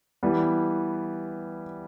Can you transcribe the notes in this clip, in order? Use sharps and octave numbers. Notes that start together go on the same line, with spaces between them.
E3 G3 B3